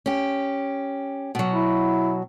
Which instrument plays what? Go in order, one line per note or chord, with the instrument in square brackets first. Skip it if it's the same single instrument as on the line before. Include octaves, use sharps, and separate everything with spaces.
[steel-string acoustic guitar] C#4 G4
B2 F#3
[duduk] E4